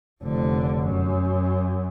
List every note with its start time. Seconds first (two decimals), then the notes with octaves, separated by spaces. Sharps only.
0.23 F1 D3
0.81 F#2